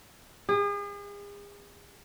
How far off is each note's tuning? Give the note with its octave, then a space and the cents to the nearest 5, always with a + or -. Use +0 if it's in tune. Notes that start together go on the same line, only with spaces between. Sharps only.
G#4 -40